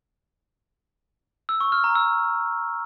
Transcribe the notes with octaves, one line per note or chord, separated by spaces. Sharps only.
E6
C#6
F6
A#5
E6